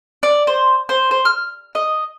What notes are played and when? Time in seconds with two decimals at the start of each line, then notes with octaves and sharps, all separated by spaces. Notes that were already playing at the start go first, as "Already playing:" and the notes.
0.23 D5
0.47 C5
0.89 C5
1.11 C5
1.25 F6
1.75 D#5